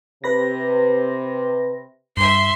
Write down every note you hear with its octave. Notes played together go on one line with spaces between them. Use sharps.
C3 B4 B5 A#6
G2 E5 C6